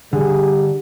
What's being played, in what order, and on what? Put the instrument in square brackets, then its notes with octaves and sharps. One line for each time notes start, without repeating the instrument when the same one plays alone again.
[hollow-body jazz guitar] D3 [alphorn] G3 [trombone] G#4